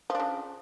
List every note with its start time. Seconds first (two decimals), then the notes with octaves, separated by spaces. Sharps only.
0.10 F3
0.15 D4
0.20 C#3